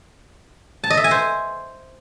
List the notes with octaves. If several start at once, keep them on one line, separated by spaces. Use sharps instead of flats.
A5
D#5
E5
G#5
C5